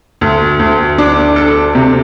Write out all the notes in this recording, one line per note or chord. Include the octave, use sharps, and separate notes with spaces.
D2
D2
D4
A4
C3